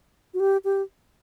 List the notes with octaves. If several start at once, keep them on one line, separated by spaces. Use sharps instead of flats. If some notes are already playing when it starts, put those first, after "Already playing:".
F#4
G4
G4